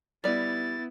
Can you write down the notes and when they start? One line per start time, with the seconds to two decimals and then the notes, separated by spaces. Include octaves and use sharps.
0.24 G3 B3 E4 D5 A6